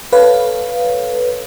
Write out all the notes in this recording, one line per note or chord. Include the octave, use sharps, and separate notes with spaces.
A4 B4 C#5 F5